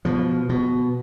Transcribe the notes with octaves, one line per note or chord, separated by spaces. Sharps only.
B2 F3
B2